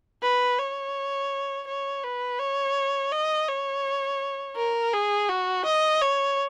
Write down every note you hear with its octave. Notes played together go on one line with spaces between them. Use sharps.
B4
C#5
C#5
B4
C#5
D#5
C#5
A#4
G#4
F#4
D#5
C#5